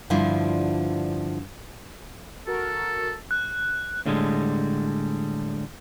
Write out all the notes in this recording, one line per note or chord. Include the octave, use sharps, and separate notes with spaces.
G2 D3 F3 D4 E4 F4
F#4 A4 A#4
F#6
A2 D3 G3 G#3